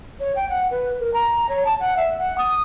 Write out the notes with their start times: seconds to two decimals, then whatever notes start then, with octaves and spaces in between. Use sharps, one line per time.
0.20 C#5
0.36 G5
0.49 F#5
0.71 B4
1.00 A#4
1.13 A#5
1.49 C#5
1.65 A5
1.80 F#5
1.96 E5
2.18 F#5
2.38 D#6